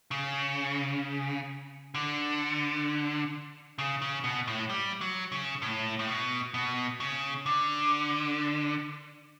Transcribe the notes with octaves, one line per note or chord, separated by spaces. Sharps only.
C#3
D3
C#3
C#3
B2
A2
G3
F#3
C#3
A2
A2
B2
B2
C#3
D3